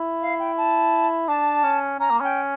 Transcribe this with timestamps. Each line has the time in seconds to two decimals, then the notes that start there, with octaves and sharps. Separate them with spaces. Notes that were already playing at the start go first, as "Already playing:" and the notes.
Already playing: E4
0.22 F5
0.39 G5
0.57 A5
1.28 D4 A5
1.64 C#4
2.00 C#4 A#5
2.11 A#3
2.21 C#4 G5